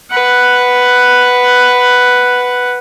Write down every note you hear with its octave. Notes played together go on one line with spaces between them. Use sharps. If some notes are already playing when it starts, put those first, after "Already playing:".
B4 F#5